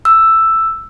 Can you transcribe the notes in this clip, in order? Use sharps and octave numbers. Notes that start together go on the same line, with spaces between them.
E6